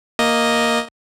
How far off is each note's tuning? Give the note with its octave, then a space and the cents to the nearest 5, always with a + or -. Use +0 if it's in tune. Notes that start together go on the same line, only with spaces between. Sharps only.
A#3 +0 D#5 +0